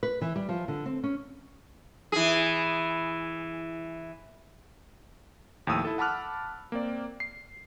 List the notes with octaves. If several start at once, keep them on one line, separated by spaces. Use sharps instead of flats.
B4
E3
G3
F3
D3
C4
C#4
E3 G#4
D#2 A2 F3 D#6 E6 D#7
E4 A4
F#5 A5 B5 D6 F6 F#6
A#3 C4 D5
C7